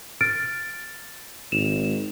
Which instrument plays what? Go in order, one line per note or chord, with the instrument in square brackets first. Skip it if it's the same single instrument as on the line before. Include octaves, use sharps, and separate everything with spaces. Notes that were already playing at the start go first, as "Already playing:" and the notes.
[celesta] F6 A6 D7
[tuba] G#1 [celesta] E7 F7